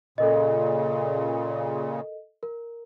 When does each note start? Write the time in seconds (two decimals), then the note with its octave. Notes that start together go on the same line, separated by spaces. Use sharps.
0.18 A#2 C#3 A4 A#4 D#5
2.43 A#4